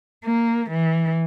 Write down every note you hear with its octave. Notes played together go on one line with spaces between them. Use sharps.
A#3
E3